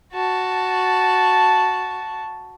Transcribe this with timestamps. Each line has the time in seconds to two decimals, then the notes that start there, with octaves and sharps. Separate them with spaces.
0.13 F#4 A5